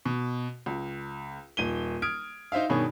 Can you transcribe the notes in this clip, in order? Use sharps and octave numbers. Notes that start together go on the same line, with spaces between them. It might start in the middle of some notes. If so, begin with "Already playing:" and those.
B2
C#2
D#1 D#7 G7
D#6 F6 G#6 D7
D#4 C5 E5 F5
G2 B2 D#3 G#4 C#5